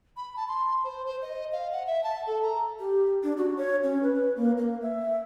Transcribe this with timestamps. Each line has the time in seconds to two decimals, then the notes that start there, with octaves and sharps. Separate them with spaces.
0.17 B5
0.36 A5
0.48 C6
0.84 C5
1.06 C5
1.22 D#5
1.52 F5
1.72 F#5
1.87 E5
2.04 A5
2.27 A4
2.43 A#5
2.79 G4
3.23 D4
3.37 F#4
3.57 C#5
3.83 C#4
4.03 B4
4.36 A#3
4.57 A#3
4.82 E5